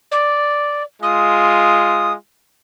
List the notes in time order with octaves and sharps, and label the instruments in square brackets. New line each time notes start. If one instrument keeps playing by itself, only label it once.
[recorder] D5
[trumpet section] G#3 F4 [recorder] D#6